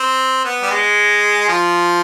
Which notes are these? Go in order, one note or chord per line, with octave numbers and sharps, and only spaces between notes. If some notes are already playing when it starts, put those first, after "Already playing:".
Already playing: C4
B3
G3
G#3
F3